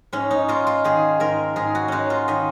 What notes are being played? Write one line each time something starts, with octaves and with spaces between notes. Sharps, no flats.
G#2 C#4
D#4
G#3 F4
F4
D#3 G#4
G#2 A#4
G#2 G#4
F#4
G#3 C#4 D#4
F4
D#3 D#5